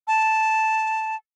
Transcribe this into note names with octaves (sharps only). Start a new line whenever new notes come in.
A5